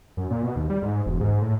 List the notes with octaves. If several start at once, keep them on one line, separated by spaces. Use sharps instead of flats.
F#2
A#2
B2
D#2
G3
G#2
E1
G#2
A2